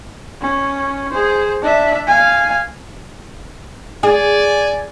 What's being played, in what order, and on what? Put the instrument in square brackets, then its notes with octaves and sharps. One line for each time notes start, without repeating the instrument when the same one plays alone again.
[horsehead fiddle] C#4
G#4 C5
D4 E5
F5 G#5
[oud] G#4 [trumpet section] D5 G#5